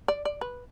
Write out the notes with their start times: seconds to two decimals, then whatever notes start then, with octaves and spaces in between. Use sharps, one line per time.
0.08 D5
0.25 D5
0.41 B4